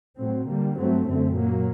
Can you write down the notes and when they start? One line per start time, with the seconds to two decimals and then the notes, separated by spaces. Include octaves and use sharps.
0.18 A2 F#3 C4
0.47 D3 G3 A#3
0.77 G2 F#3 A3 C4
1.05 F#2 D3 A3 C4
1.35 A#2 F#3 A#3